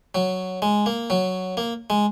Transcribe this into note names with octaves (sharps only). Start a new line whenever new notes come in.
F#3
G#3
A#3
F#3
A#3
G#3